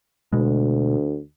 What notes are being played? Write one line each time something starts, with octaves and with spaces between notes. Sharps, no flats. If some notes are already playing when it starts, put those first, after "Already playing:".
D2 B2 G#3